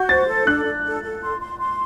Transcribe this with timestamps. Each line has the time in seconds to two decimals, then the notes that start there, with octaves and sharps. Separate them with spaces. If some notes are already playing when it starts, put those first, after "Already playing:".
Already playing: F#4 G6
0.09 C5 A6
0.28 A4
0.46 D4 F#6
0.65 D4
0.85 A4
1.03 A4
1.23 C6
1.41 C6
1.60 C6